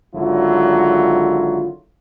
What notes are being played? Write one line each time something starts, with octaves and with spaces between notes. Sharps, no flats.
G#1 D3 F#3 E4 F4